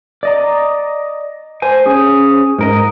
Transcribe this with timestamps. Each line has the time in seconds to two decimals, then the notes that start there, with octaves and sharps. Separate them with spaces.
0.23 D5 D#5 A#5
1.62 C5 G#5
1.86 C#4 G#4
2.59 G#2 A#4 D#5